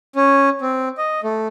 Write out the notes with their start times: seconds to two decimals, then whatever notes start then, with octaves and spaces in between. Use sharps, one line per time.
0.16 C#4
0.62 C4
0.98 D#5
1.23 A3